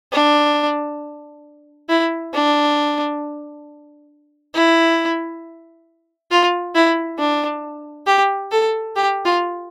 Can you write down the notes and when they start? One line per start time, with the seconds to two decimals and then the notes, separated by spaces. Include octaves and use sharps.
0.12 D4
1.89 E4
2.34 D4
4.54 E4
6.31 F4
6.75 E4
7.18 D4
8.06 G4
8.51 A4
8.96 G4
9.25 F4